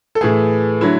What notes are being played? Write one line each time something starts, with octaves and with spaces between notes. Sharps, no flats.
A4
A2 E3 A3 G#4
D3 F#3 A3 E4